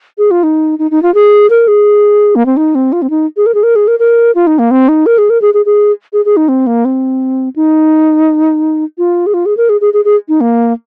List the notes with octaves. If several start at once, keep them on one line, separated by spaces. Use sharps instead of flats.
G#4
F4
D#4
D#4
D#4
F4
G#4
A#4
G#4
A#3
C4
D#4
C4
F4
C4
D#4
G#4
A#4
G#4
A#4
G#4
A#4
A#4
F4
D#4
A#3
C4
D#4
A#4
G#4
A#4
G#4
G#4
G#4
G#4
G#4
D#4
C4
A#3
C4
D#4
F4
G#4
F4
G#4
A#4
G#4
G#4
G#4
G#4
D#4
A#3